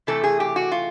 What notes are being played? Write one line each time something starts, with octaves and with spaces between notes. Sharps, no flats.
C3 E3 A3 A4
G#4
G4
F#4
F4